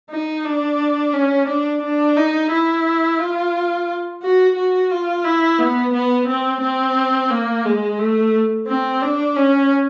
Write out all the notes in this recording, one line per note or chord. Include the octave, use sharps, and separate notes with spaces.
D#4
D4
C#4
D4
D4
D#4
E4
F4
F#4
F#4
F4
E4
B3
B3
C4
C4
A#3
G#3
A3
C4
D4
C#4